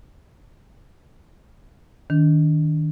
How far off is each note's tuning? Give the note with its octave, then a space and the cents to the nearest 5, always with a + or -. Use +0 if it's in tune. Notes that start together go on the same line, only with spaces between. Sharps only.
D#3 +0 D4 -25